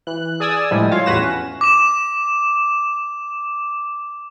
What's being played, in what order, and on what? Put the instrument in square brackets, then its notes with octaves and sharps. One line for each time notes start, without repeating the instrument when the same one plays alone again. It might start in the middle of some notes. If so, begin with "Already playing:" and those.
[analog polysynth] E3 F#6
G#4 D5 G#5 D#6 E6
A2 D3 F3 G3 G#3
F4 C#5 F5
E2 A2 F#4 B4 A#6 E7
C#4
[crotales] D6 E7